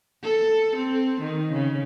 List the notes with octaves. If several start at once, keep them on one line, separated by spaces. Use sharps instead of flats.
A4
C4
D#3
C#3